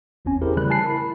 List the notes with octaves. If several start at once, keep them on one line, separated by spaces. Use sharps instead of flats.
G1 E2 C4 C#4 G#5
E4 G4 G#4 A#4 C5
C#3 E3 G3 A3 B5 F#6
G#5 A5 F#6 C7
E4 A#4 B5
B5